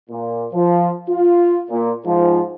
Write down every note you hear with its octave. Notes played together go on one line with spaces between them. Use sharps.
A#2
F3
F4
A#2
G#2 F3